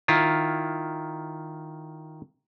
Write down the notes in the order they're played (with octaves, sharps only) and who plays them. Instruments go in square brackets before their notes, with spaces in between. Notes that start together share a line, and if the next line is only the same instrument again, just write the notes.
[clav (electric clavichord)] D#3 E4 F4